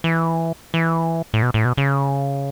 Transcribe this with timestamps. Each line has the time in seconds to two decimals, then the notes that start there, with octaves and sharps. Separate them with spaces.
0.04 E3
0.74 E3
1.34 A2
1.43 B2
1.54 A2
1.65 B2
1.78 C#3